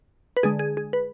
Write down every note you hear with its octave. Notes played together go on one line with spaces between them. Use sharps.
B4
D3 G#3 G#4
G#4
G#4
B4